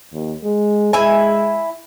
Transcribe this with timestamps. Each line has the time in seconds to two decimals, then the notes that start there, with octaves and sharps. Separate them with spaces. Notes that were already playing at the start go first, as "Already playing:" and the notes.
0.13 D#2
0.44 G#3
0.93 G#3 E4 E5 G#5